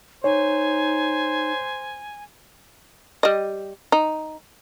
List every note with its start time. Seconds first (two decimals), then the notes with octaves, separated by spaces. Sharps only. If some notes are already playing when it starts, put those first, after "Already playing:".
0.24 D#4 C5 C#5 G#5
3.23 G3 D#5
3.92 D#4